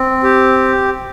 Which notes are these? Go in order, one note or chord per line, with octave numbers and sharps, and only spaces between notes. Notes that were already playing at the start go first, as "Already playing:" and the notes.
Already playing: C4
G4